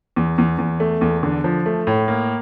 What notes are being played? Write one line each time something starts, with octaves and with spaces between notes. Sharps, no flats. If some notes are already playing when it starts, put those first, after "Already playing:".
E2
E2
E2
A3
E2
D3
F3
A3
A2
A#3